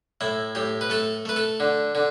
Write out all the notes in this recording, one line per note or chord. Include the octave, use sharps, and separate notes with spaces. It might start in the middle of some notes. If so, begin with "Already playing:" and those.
A2 E4
A2 G4
B4
A3 A4
A3 B4
A4
D3
D3